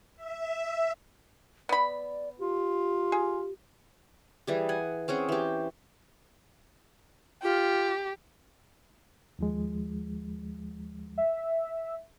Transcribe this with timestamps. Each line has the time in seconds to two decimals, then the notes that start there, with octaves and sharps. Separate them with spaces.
0.16 E5
1.69 B3 D5 B5
2.39 F4 G4
3.12 G#4
4.47 E3 G3 G#4
4.69 F#5 G#5
5.08 C4 C#4 G#4 F#5
5.29 E3 G4
7.43 F4 G4
9.39 D#2 F3 G#3
11.18 E5